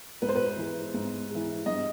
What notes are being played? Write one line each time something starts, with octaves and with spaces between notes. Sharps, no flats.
G#2 B4
C5
B4
E3 G#3
G#2
E3 G#3
G2 D#5